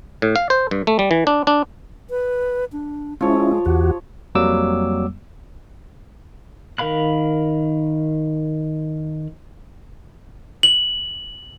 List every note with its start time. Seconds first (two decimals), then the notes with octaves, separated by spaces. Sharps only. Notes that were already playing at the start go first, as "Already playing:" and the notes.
0.22 A2
0.36 F5
0.50 C5
0.71 G2
0.87 A3
0.99 G3
1.11 E3
1.27 D4
1.47 D4
2.10 B4
2.72 D4
3.21 F3 G#3 C#4 E4 C#5
3.66 E2 F#4 G4
4.35 F2 F#3 G3 A#3 D6 E6
6.78 D#3 A#4 F5 B5 F#6
10.63 F#7